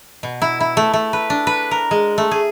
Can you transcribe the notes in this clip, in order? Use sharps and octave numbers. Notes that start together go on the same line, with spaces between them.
B2
E4
E4
A3
A3
B4
D4
B4
A#4
G#3
A3
G#4